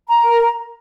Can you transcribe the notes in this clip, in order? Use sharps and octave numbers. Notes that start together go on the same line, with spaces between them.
A#5
A#4